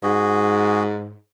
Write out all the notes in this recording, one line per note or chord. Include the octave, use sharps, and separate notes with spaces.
G#2 F#4 G#4